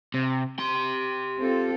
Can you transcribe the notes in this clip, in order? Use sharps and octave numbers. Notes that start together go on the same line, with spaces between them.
C3
G4 C6
C4 F4 A4